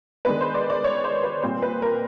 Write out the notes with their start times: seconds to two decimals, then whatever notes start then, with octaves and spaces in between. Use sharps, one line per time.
0.25 D#3 G#3 B3 D4 B4
0.41 C5
0.54 D5
0.70 D5
0.84 C#5
1.04 C5
1.23 B4
1.42 A#2 G3 C4 C5
1.62 B4
1.82 A#4